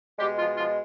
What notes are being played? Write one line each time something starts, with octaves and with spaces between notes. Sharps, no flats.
B2 G3 G#3 G4
F3 F4
F3 F4